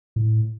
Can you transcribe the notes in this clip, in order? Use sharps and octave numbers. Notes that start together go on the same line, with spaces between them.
A2